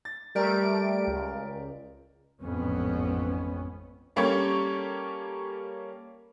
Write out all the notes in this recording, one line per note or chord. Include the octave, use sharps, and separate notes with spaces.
A6
G3 A3 G4 A#4 D5 D7
C#2
A1 F2 G#2 B3 C#4
G3 A#3 C#4 G4 A4 C#5